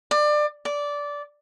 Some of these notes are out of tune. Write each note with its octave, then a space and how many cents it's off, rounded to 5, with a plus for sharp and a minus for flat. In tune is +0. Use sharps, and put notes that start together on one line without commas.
D5 +25
D5 -15